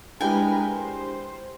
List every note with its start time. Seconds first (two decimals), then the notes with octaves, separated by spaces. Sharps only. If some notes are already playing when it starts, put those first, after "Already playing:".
0.21 G#3 D4 E4 G4 A#4 B4 G5 G#5
0.73 C5